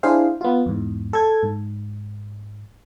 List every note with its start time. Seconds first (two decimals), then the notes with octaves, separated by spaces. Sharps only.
0.03 D4 E4 G#4 C5 F5
0.41 B3 F4
0.66 E2 G#2
1.13 A4 G#6
1.43 G#2